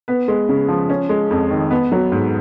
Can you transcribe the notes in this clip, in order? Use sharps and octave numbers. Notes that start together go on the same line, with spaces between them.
B3 B4
G#3
C#3
F3
C#4
G#3
F2
D#3
B3 B4
F#3
G#2